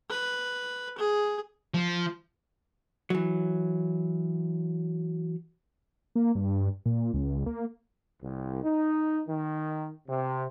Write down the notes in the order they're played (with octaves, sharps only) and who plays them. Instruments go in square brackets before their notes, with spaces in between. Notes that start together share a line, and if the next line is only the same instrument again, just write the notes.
[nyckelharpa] B4
G#4
[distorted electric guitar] F3
[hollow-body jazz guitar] E3 F#3
[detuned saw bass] A#3
G2
A#2
C#2
A#3
[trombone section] C2
D#4
D#3
C3